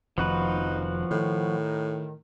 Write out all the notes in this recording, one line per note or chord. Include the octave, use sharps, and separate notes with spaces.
F1 F2 D#3 F3 D#4 F#4 B4
A2 D#3